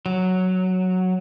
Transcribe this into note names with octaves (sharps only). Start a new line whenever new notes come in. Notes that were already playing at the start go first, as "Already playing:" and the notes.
F#3